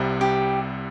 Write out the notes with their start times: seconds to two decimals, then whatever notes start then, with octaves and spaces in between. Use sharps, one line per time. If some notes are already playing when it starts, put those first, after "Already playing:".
Already playing: C2 C3 G3
0.21 G4